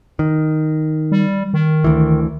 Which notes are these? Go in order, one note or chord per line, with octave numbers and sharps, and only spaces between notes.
D#3
G3
D#3
D2 E3